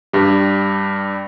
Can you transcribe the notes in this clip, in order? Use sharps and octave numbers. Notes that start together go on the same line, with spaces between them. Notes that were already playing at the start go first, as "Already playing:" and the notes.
G2 G3